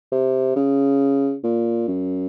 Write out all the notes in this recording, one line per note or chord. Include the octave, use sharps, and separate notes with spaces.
C3
C#3
A#2
F#2